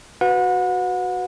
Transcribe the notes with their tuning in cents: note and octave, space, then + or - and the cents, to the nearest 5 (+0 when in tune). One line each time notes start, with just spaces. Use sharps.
F#4 +0 B4 +10 F#5 -35